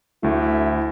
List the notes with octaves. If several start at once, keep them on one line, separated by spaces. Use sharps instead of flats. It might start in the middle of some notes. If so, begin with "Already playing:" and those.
D2 A3 E4